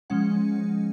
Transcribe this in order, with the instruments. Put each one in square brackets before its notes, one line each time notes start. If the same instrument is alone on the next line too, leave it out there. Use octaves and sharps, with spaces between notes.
[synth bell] F3 G#3 C#4 F#5